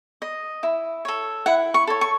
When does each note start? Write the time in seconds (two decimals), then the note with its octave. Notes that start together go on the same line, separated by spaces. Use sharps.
0.22 D#5
0.63 E4
1.05 A4 C#5
1.46 E4 F#5
1.74 C#6
1.87 A4 C#5
2.01 C#6